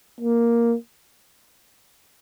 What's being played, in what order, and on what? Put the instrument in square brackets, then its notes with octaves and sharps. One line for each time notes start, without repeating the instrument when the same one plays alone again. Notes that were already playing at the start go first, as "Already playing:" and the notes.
[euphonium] A#3